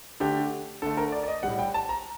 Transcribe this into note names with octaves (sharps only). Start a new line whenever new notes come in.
D3 A3 G4
D3 A3 A4
A#4
D5
D5
D#5
A2 G3 F#5
G5
A5
A#5